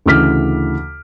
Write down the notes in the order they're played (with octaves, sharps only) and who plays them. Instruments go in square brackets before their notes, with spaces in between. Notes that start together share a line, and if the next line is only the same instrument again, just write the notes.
[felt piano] D2 C#3 E3 D6 F6 B6